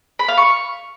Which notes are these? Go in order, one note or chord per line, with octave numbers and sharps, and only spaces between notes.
B5
F5
C#6